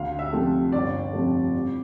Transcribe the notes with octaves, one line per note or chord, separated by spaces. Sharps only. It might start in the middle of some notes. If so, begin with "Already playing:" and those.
Already playing: D2 F5
E5
C3 F3 A3
G1 D5
F2 C3 F3 A3
C2